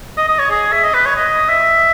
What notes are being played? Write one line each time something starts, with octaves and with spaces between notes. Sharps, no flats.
D#5
D#5
C#5
G#4
E5
D#5
B4
C#5
D#5
E5